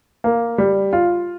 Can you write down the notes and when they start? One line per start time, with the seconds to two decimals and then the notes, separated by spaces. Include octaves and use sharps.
0.24 A#3
0.58 G3
0.93 F4